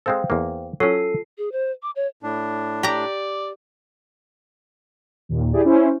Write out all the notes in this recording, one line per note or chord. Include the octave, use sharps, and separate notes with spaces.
G#3 C4 A4 C5 F5 G5
E2 A#3
F#3 C#4 F4 A4 C7
G#4
C5
D6
C#5
A2 D4
G4 D5 A#5
D#2 A#2
E4 G4 G#4 D5
C#4 E4 C5